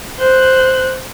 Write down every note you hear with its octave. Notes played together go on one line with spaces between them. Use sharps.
C5 F#6